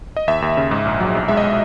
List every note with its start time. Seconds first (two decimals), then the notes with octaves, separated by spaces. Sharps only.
0.17 D#5
0.28 D#2 E5
0.42 D#2
0.57 C#3
0.71 G#2
0.85 A#1
1.00 F#3
1.15 B1
1.28 G#3 E5
1.37 D#5
1.44 G#3